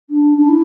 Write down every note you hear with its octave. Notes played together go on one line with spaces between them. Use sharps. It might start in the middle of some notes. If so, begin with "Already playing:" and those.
D4
D4
E4